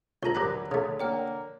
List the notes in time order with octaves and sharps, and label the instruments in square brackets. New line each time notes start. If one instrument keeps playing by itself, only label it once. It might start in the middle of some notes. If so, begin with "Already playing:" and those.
[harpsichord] C#2 A#5 [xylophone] A#4 A5 C#6
[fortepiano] D2 F#3 [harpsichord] G4 B4 A#5
[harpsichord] C#3 A3
[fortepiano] D3 A#3 [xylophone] C#5 G5 F6